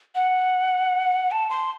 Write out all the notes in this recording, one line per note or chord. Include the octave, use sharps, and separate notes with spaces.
F#5
A5
C6